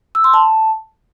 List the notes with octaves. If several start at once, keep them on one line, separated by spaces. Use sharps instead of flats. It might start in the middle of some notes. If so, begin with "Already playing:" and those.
E6
C6
A5